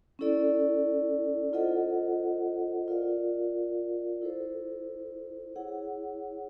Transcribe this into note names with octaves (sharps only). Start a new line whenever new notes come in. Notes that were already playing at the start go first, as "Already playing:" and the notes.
C#4 E4 A4 D5
F4 A4 C5 D#5 F#5
F4 A#4 D5 F5
E4 A4 C5
E4 G#4 C#5 F#5